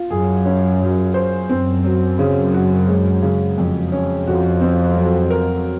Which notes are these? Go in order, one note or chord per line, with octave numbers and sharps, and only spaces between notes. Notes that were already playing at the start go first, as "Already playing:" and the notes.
Already playing: F4
F#2 G#4
C#4
F#3
C5
F#2 C4
F#3
C#3
F#4
G#3
C#3
F2
C#4
F2 F#4
C4
F#3
A#4